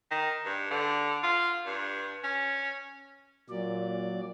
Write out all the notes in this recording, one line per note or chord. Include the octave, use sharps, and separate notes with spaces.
D#3
G2
D3
F4
G2
C#4
A#2 F#3 D5